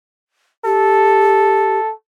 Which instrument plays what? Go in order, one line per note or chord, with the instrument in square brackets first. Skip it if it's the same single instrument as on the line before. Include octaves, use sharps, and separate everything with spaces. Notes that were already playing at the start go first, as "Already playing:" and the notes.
[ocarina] G4 [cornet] A4